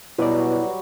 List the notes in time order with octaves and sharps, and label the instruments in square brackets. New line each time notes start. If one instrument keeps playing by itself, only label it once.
[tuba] B2 [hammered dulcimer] F#3 G3 F#4 [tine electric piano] E4 [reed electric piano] B4 D5